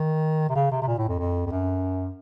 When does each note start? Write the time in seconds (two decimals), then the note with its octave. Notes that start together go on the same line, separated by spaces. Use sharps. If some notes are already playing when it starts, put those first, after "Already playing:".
Already playing: D#3
0.49 C3
0.56 C#3
0.71 C3
0.82 C3
0.87 A#2
0.98 A2
1.08 F2
1.19 F2
1.46 F2
1.51 F#2